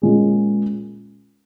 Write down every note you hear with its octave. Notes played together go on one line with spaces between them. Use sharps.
A#2 G#3 C#4 G#4